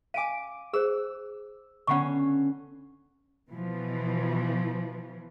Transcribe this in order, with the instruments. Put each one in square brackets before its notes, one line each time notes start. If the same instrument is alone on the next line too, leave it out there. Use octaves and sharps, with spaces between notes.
[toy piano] F5 G#5 [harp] D6 D7 D#7
[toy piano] G#4 C5 [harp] E6
[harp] D3 B3 C#4 [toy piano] F#5 B5 C#6
[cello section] B2 E3 F3